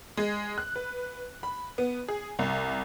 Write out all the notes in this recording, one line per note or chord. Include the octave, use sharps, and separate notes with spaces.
G#3
F#6
B4
B5
B3
G#4
C2